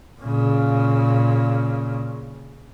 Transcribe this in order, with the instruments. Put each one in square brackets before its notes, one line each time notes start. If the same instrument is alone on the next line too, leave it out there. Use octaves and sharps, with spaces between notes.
[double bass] A#2 C#3